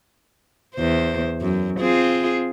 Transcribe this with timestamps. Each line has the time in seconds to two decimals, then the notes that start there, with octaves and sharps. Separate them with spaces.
0.75 E2 C5
1.42 F#2
1.80 C4 F4 G#4